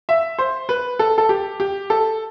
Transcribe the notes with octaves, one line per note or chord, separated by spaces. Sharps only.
E5
C5
B4
A4
A4
G4
G4
A4